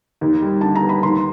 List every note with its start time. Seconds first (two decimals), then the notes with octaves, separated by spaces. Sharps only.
0.21 D#2
0.42 G3
0.61 D3 A5
0.75 A#5
0.82 B3
0.89 B5
1.03 D#2 C6